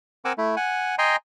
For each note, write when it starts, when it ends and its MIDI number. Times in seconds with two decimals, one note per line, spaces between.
0.25 0.33 60
0.25 0.33 70
0.25 0.33 78
0.25 0.33 80
0.25 0.33 86
0.25 0.33 88
0.38 0.55 57
0.38 0.55 64
0.56 0.95 78
0.56 0.95 80
0.98 1.16 75
0.98 1.16 79
0.98 1.16 80
0.98 1.16 82
0.98 1.16 84